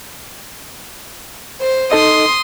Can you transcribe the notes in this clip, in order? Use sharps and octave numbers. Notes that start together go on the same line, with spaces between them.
C5
D#4 A4 D#5 C6 D#6